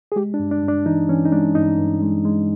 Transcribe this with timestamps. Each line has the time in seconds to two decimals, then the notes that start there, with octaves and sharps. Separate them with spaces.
0.12 G#4
0.16 G#3 G4
0.34 D4
0.39 G2
0.51 D4
0.63 G2
0.68 D4
0.86 E3 D#4
1.09 E3 C#4
1.25 D#4
1.32 G#3 D4
1.55 G2 D#4
1.79 G2
2.02 G#3
2.25 G#3